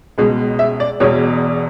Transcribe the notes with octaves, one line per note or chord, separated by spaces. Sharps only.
C#2 B2 G#3
E5
D5
E1 E2 B2 C#5